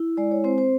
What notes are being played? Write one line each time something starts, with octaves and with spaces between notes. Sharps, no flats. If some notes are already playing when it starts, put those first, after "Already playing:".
Already playing: E4
G#3 D5
C#5
C4 C5
C5